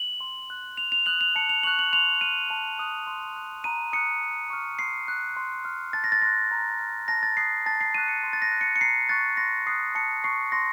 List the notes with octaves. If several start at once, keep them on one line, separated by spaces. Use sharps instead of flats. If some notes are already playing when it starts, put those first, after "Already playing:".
Already playing: F#7
C6
F#6
C6 F7
F7
D#6 F#6 F#7
F7
A5 C#7
F7
C#6 F#6 F#7
F#7
C6 F7
F6 D#7
A5
D#6 F#6
C6
F#6
A#5 D#7
D#6 F#6 C#7
A#5
C#6 F6
C6 C7
F#6
C6
F6
A5 A6
A#6
A6
C6 F#6 A#6
A#5
F6
A5 A#6
A6
D#6 F#6 C7
A5 A6
C7
C#6 F#6 D#7
C#7
C6
A6
A#6
F#6
C#7
C#7
A#5 C7
C#6 F#6 A6
C6 A#6
D#6 F#6 C7
A5 C#7
C#6 F#6 C7
C6 A#6